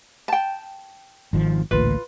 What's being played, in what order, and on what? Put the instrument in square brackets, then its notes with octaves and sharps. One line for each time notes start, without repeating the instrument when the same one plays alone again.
[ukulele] G5 A5
[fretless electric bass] G#1 D#3 F3
[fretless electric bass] A1 D2 A#2 [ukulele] F4 B4